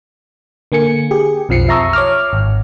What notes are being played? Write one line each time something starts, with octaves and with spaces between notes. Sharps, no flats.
D3 A#3 G#5 C#7
G4 G#4
B1 F2 F3 C7 C#7
E5 A5 A#5 C#6 D#6 E6
C#5 D6 F6
G#1